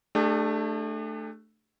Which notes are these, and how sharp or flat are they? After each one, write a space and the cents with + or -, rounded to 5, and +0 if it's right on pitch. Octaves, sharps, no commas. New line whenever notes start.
A3 +0 D4 +25 G4 +45